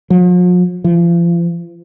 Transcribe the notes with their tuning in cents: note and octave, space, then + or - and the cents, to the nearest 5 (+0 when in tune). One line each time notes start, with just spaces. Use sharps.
F3 +45
F3 -35